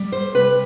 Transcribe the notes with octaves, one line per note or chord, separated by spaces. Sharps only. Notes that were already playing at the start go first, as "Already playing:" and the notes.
Already playing: G3
C5
C3 B4